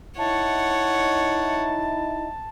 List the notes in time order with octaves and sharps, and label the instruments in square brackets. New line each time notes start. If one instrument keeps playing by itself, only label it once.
[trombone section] D#4 E4 [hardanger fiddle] C#5 F#5 [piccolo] A5